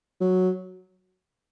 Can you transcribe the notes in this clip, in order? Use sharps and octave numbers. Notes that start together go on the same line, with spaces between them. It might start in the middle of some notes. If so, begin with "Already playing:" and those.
F#3